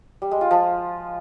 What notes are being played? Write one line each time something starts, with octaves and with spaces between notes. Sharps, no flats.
G3
G#3
F4
F3